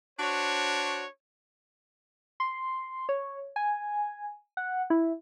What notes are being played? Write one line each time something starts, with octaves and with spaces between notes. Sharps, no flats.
D4 F#4 C5 C#5
C6
C#5
G#5
F#5
E4